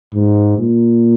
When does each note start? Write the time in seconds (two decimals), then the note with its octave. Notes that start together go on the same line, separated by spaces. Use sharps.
0.14 G#2
0.58 A#2